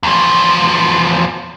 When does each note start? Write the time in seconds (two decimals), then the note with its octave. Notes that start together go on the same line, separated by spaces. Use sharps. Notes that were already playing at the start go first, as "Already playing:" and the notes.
0.03 E2 F3